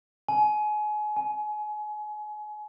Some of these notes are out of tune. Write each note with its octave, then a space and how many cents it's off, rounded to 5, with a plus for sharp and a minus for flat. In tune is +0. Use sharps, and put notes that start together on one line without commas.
G#5 +30
G#5 +10